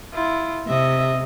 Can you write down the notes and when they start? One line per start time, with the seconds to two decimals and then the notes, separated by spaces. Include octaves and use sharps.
0.13 E4 F4
0.67 C3 D#5 E5